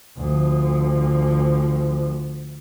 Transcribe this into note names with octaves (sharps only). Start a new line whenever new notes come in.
D2 F3